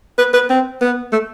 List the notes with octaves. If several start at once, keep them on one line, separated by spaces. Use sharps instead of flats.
B4
B4
C4
B3
A3